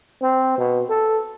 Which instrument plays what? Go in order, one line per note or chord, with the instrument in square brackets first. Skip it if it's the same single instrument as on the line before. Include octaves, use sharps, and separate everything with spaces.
[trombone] C4
B2
A4